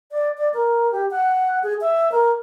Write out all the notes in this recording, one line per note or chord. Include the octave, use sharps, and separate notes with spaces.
D5
D5
A#4
G4
F#5
G#4
E5
A#4